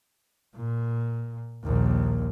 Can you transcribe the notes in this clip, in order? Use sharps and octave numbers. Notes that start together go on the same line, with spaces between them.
A#2
A#1 D#2